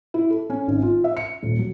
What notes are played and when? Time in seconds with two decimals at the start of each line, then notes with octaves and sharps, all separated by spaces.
0.14 E4
0.30 A4
0.50 C#4
0.68 G#1
0.82 F4
1.04 E5
1.17 C#7
1.43 D#1
1.59 F#3